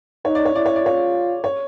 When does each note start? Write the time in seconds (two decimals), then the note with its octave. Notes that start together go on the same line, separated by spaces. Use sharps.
0.25 D#4 C#5
0.35 D5
0.45 C#5
0.55 E4 D5
0.66 C#5
0.76 D5
0.84 F4 C#5
1.44 C#5